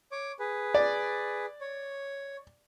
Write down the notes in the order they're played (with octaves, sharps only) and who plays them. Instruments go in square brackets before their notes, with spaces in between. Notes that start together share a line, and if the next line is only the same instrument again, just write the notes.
[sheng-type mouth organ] C#5 D6
G#4 B4
[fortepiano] D5
[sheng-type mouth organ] C#5